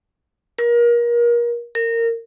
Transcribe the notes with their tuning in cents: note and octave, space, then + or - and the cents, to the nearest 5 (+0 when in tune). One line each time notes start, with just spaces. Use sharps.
A#4 +30
A#4 -20